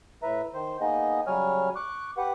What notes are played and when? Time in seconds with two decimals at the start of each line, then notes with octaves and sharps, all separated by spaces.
0.23 A2 B4 E5 A#5
0.54 D#3 C5
0.81 A#3 B3 D#4 G#4 D#5
1.27 C#3 F#3 G3 C#5 G#5 F6
1.76 C#6 D6 F#6
2.17 G4 B4 F#5